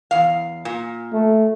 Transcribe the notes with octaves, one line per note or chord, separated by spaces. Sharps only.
E2 F5
A#2
A3